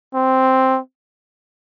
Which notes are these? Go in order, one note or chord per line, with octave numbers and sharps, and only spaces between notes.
C4